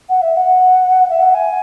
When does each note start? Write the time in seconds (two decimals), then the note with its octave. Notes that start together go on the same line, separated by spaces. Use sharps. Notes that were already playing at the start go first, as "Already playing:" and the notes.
0.09 F#5
0.21 E5
0.36 F#5
1.10 E5
1.22 F#5
1.34 G#5